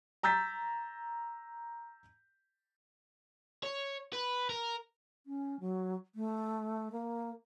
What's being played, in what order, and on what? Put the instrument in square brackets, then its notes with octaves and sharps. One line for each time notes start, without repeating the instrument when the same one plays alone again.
[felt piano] A#5 E6 G6 A6 B6
[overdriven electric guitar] C#5
B4
A#4
[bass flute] C#4
F#3
A3
A#3